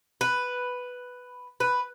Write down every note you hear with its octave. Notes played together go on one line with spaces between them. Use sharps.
B4
B4